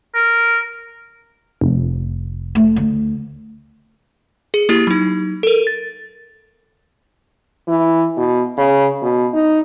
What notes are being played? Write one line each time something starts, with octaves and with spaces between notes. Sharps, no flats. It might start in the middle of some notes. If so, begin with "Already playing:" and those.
A#4
F1
A3
D2
G#4
A#3 E4 G4
F#3 D#4
A4 A#4
A6
E3
B2
C#3
B2
D#4